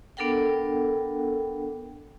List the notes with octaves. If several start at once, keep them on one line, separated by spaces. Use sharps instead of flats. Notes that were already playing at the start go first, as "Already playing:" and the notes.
B3 D4 A4 A#4 F#5 G5